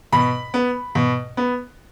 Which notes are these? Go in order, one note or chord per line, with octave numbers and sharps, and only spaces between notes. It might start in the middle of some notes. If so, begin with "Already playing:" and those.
B2 B5
B3
B2
B3